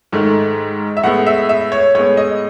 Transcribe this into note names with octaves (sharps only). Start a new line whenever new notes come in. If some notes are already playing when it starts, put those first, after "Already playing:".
G#2 D#3 A3
E5
A2 G#3 B3 F#5
E5
E5
C#5
A2 G#3 B3 C#5
D#5